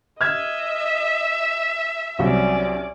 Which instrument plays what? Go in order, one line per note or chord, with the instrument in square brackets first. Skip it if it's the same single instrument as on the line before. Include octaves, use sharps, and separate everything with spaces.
[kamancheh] D#5 [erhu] E5 [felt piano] F6 G#6
[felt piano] C2 F#3 C4 [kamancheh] C#4 D5